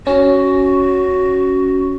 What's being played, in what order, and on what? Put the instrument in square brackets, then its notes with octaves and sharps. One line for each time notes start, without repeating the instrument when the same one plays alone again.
[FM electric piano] C#4 [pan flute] F#4